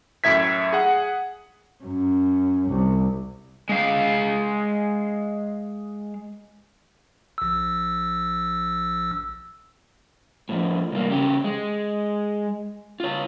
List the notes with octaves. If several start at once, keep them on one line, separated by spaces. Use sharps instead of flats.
F#2 A2 E5 G#6 B6
G#4 F#5
F#2
C2
G#3 F5
A#1 E6
A2 F3
C2 A#3
C#3 G4
G#3
F4 C#5